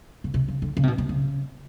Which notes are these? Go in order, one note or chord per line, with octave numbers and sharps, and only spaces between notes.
C#3
C3
C#3
D3
C#3
C3
B2
C3
C#3